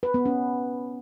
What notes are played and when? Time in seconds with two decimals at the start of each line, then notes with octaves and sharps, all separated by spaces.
0.03 B4
0.14 B3
0.26 C#4